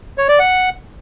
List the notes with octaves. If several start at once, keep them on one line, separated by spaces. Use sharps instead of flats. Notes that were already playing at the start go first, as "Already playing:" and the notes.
C#5
D5
F#5